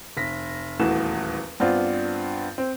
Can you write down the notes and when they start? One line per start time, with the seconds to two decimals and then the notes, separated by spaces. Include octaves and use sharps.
0.17 F1 A#6 B6
0.79 D#1 E2 E3 A3 F#4 E7
1.60 G2 B3 C4 D4 F4
2.58 C4